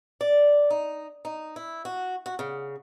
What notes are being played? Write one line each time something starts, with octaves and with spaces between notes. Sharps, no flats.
D5
D#4
D#4
E4
F#4
F#4
C#3